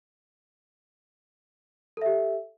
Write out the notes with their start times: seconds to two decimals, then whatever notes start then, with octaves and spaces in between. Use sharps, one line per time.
1.97 A4
2.02 E5
2.06 G4